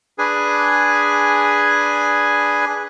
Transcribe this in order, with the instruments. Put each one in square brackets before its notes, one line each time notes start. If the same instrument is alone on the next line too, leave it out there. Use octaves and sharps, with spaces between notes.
[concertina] D4 G#4 B4 G#5